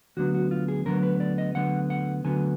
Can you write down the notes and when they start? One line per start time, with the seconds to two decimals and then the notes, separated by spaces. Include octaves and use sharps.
0.17 D2 D3 F#3 B3 F#4
0.34 F#4
0.51 F4
0.68 G#4
0.85 D2 D3 F#3 B3 A#4
1.03 B4
1.20 D5
1.38 D#5
1.55 D2 D3 F#3 B3 F#5
1.90 F#5
2.24 D2 D3 F#3 B3 G#5